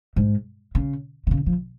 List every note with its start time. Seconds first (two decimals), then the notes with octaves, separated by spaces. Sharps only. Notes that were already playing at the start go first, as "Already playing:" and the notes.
0.16 G#2
0.75 C#3
1.27 C3
1.31 C#3
1.46 F3